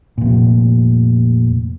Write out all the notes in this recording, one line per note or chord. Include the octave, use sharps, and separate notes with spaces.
F1 A#2